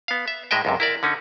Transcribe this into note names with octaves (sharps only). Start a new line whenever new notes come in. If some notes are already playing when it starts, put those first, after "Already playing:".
B3 F5
E5
A2 G#3 D#5 E5 G5
C#2 F#2 C3
E4 A#4 D5
D3 C#4 D#4